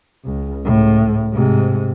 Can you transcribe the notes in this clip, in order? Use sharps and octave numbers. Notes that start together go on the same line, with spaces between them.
C#2
C#2 A2
G#2 C3